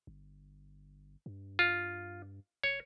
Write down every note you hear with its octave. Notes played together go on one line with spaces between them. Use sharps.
G1
G2
F4
E1 C#5